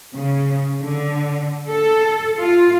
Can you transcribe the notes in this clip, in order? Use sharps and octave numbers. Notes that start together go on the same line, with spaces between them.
C#3
D3
A4
F4